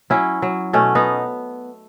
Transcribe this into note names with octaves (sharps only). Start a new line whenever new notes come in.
F#3 C#4 E4
F#3
B2 A3 C#4
B3 D#4